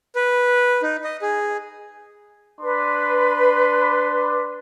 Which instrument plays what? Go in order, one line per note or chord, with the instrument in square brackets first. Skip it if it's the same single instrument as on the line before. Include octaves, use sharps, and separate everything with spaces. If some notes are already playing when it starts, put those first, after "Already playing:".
[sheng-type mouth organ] B4
D#4
D#5
G#4
[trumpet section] D4 C6 [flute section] B4